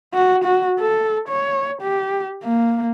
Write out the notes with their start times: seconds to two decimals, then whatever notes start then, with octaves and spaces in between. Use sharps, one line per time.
0.14 F#4
0.44 F#4
0.79 A4
1.29 C#5
1.82 G4
2.43 A#3